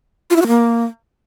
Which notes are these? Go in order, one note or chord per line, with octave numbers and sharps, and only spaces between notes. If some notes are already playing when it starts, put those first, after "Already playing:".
F4
E4
F#4
A#3